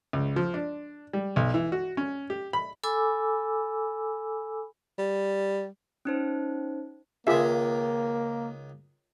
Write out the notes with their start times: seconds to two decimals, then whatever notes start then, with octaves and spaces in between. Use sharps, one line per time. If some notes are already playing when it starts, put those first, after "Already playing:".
0.13 C#2
0.36 F3
0.54 D4
1.13 G3
1.36 B1
1.54 E3
1.72 F#4
1.97 C#4
2.30 G4
2.53 B5
2.84 A4 G#5 B5 D6 E6
4.98 G3
6.05 C#4 D#4 C5
7.27 C#2 D#3 A#3 F4 G#4 E5